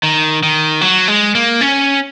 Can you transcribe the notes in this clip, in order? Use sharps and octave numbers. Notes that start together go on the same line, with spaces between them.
D#3
D#3
F#3
G#3
A#3
C#4